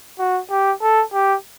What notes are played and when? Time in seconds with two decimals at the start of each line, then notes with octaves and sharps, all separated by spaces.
0.19 F#4
0.50 G4
0.82 A4
1.13 G4